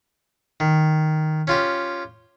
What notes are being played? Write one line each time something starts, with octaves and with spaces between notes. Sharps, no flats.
D#3
C#4 F4 G4